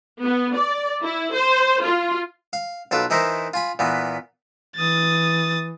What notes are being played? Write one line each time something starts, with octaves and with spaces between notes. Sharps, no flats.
B3
D5
E4
C5
F4
F5
B1 F4 A4 B4 D6
E3 D#4 E4 A#4 C5
F4 G#5 B5
A#2 E3 B3
E3 D#6 A6